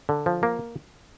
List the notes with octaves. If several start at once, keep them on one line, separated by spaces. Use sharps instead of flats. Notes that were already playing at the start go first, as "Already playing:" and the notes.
D3
F3
A#3